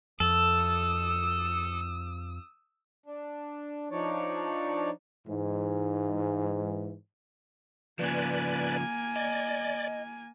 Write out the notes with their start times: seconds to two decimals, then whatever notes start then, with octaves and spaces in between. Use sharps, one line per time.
0.20 F2 A4 D#6 E6
3.06 D4
3.91 F3 D4 D#4 C#5 D5
5.28 G#2 E3
7.99 C#3 F3 A#3 B4 D5 G#5
9.16 D5 D#5